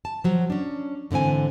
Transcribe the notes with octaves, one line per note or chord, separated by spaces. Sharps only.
A5
F3 F#3
C#4 D4
G#2 D3 E3 C4 G#5